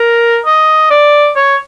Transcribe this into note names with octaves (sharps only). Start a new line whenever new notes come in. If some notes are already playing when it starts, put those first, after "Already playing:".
Already playing: A#4
D#5
D5
C#5